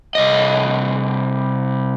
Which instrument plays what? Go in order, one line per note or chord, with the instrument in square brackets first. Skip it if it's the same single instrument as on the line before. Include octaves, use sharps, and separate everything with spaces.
[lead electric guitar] C2 D#5